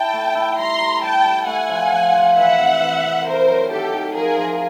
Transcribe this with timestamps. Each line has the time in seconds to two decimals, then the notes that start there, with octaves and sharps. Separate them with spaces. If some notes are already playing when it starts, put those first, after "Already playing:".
Already playing: E4 G5 A5
0.13 A3
0.35 E4
0.58 G3 A#5 C6
0.81 G3
1.03 G3 G5 A5
1.24 G3
1.47 A3 F#5 G#5
1.69 F3
1.91 F3
2.13 F3
2.36 E3 E5 F#5
2.59 C3
2.81 E3
3.03 C3
3.26 A3 A#4 C5
3.48 F#3
3.70 D#3 G4 A4
3.92 D#3
4.14 F3 G#4 A#4
4.37 F3